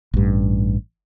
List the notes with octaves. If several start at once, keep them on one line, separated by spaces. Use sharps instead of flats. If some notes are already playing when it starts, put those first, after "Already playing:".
A1 G2